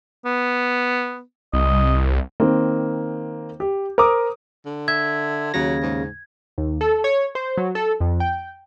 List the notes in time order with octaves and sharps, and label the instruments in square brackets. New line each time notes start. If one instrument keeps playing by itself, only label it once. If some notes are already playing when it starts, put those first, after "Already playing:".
[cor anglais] B3
[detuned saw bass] C2 [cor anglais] D#5
[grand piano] D#3 A#3 C4
G4
A#4 C5 A#5 D6 D#6
[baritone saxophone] D3
[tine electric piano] E5 [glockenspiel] G#6
[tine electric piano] D#2 C#3 A#6 [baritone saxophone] F#3
[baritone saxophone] G#2
[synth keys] D#2
A4
C#5
C5
F#3
A4
F2
G5